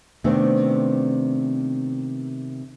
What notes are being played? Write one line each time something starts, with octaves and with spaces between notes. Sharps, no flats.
C3 D#3 A3 B3 C4 D4